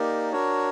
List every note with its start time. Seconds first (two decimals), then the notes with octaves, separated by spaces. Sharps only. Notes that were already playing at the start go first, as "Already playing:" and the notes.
Already playing: A#3 D#4 G4 A#4 D5
0.32 D4 F#4 A#4 C#5